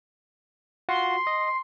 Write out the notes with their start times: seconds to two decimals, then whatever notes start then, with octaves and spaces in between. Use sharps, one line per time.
0.89 F4 F#4 F#5 C6
1.27 D#5